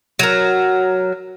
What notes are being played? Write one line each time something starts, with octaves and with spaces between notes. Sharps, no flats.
F#3 A#4